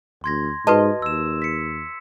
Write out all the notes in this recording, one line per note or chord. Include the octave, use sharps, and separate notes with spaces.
D2 C6 G#6 A#6
G#2 F#4 B4 D#5 A5
D#2 E6 E7
B6 C#7